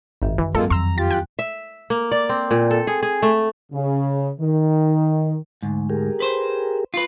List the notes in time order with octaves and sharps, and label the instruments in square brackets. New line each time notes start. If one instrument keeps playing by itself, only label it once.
[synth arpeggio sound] G#1 [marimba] F#2 D#3 E5
[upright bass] D3 [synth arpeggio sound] E3
[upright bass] G#2 D#3 [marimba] F#3 C4 [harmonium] G#3 A#3 F4 [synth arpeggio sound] A4
[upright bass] F2 [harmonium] A#5 [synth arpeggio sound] C6 E6
[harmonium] F4 G4 [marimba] G5 [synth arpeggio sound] A6
[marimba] E2 [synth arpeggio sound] G5 F#6
[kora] E5
A#3
D5
C4
A#2
A4
G#4
G#4
A3
[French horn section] C#3
D#3
[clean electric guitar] D2 G#2
[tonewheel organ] G4 G#4 A#4
[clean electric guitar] B4 C5
F4 B4